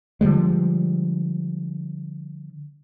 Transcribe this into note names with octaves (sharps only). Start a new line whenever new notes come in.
D3 F3 G3 G#3